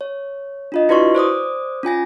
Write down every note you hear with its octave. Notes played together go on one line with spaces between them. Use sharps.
C#5
D4 F4 D#5
E4 F#4 B4 D5 C6 C#6
C5 D5 D6 D#6
C#4 F4 G#5 A#6